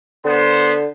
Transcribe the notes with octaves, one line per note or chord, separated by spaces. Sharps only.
D3 B3 C5